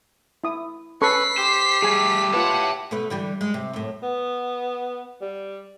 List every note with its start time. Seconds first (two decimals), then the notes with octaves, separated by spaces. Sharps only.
0.44 E4 D#6
1.01 C#4 A4 B4 C#6 B6 C7
1.38 G4 C5
1.82 G3 A3 G#4 G#5
2.34 F4 B4 C#5 E5 F#5 A5
2.91 B2 A3 B4
3.10 D3 E3 G3
3.41 G#3
3.54 C3
3.73 F#2 A2
4.02 B3
5.21 G3